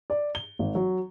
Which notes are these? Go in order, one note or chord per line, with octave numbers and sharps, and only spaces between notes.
D5
G7
G#1
F#3